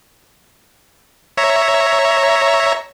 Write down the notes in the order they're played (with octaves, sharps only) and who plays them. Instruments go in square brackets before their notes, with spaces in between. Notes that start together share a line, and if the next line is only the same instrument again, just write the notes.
[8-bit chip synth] C#5 E5 A#5